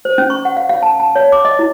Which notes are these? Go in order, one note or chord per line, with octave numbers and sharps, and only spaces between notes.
C5
C#4
C#6
F#5
F5
F5
A5
A5
C#5
D6
D#5
E4